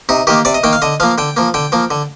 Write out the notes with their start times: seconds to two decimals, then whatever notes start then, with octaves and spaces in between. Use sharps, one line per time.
0.09 C3 D#4
0.27 D#3 A#3 G4
0.45 C3 D5
0.54 D#5
0.63 D#3 A#3 G5
0.73 F5
0.82 D3 D#5
1.00 F3 A#3 F5
1.18 D3 G5
1.37 F3 A#3
1.54 D3 G5
1.72 F3 A#3
1.91 D3